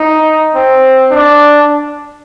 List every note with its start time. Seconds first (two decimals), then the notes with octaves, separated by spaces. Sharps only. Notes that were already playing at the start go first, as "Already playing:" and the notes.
Already playing: D#4
0.55 C4
1.11 D4